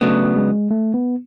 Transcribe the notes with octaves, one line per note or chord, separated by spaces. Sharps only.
C#3 F#3 A3 B3 D4
G#3
A3
B3